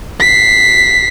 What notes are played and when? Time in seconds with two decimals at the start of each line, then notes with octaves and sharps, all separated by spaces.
0.20 B6 C7